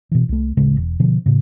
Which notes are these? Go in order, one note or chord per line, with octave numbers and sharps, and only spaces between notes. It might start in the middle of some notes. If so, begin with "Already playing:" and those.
B2 E3
C2 A3
D1 A1 C#3 G#3
E1
B2 D3 F3
A2 C#3